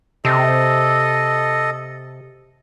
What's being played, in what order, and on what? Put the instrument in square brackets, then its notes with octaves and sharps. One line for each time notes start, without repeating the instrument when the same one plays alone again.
[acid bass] C3 [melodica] A4 D#5